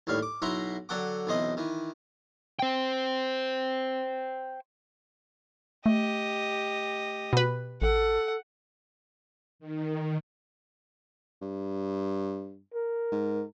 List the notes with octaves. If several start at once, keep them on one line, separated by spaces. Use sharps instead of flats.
D#2 A2 G3 F5
D6
B1 E4 F#4 E5 A#5 C6
D3 F#3 A4 F#5 G5 D6
B1 C3 E3 C5 D#5
D#3 E3
C5 G5
A3 G4 D#5
B2 B4
A1 A4 F#5
D#3
G2
A#4
G#2